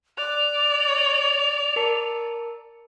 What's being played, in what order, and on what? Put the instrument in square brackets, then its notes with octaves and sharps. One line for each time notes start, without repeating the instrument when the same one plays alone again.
[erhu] D5 [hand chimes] F#6 [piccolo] F7
[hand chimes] A#4 A5 C#7